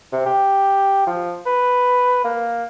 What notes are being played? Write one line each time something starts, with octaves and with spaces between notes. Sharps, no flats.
C3
G4
F3
B4
A#3